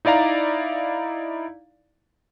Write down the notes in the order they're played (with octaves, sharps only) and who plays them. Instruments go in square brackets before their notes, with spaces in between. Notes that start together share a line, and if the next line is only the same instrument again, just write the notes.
[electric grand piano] D#4 E4 D5 F5 A#5